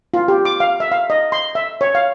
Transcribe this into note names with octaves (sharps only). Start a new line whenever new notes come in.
F4
G4
D6
F5
E5
F5
D#5
C6
E5
C#5
F5